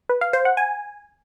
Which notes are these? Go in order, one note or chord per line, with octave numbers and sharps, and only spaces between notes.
B4
F5
C5
F#5
G#5